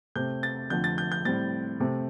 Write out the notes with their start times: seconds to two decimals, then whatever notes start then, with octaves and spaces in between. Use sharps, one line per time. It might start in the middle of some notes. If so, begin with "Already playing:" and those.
0.16 C3 A3 C4 G6
0.43 A6
0.70 F2 D3 F3 A3 G6
0.84 A6
0.98 G6
1.12 G6
1.25 A2 G3 C4 A6
1.80 C3 A3 C4